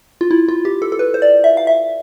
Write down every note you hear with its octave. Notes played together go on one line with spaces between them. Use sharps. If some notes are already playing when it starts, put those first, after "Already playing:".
F4
E4
F4
G4
A4
A4
B4
C5
D5
E5
F5
E5